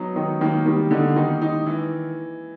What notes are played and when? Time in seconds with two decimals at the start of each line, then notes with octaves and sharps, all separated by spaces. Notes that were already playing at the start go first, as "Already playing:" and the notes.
Already playing: F#3 B3 D#4
0.16 D#3 D#4
0.41 D#3 A#3
0.66 D#3 G3
0.91 D3 D#4
1.16 D#3 D#4
1.42 D#4
1.66 E3